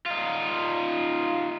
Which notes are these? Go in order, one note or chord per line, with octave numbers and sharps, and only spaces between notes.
D#4 F4